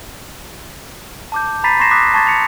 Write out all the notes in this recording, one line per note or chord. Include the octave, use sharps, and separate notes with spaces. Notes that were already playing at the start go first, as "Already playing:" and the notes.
A5 D6 G6
A#5 B5 A6 B6 C7 D#7
C6 C#6 G#6 A#6 C7 E7
D6 D#6 F#6 A#6 B6
A5 C#6 G#6 A6 E7
A6 C#7 F7